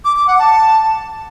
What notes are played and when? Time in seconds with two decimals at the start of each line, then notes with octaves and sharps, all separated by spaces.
0.05 D6
0.16 D6
0.28 F#5
0.39 A5